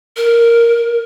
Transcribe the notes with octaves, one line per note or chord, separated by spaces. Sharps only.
A#4